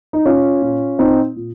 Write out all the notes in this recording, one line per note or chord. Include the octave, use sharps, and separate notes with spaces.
D#4
A#2 C#4 F4
A#2
A#2 C4 D#4
A#2